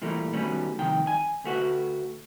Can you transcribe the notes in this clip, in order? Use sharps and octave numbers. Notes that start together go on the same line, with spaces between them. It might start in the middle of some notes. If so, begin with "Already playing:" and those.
A#2 E3 G3 A3 A#3
D#3 F#3 G3 A3 B3 C#4
C2 F2 D#3 G5
G#5
D2 A3 F#4 B4